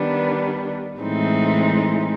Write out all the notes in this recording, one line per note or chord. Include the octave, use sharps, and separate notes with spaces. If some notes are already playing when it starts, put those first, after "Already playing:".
Already playing: D#3 G3 B3 D4
A2 E3 G#3 C4 D#4